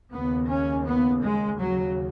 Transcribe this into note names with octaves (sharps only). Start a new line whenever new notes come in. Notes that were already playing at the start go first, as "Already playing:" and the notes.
D#2 C#3 B3
C#4
B3
G#3
D#2 C#3 F#3